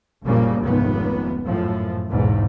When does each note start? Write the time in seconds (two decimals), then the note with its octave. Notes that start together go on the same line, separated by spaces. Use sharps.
0.23 F#1 A#2 C#3 F3 G3 A#3
0.61 F1 C#2 G#2 D#3 B3
1.46 F#2 A2 F3
2.09 B1 E2 G#2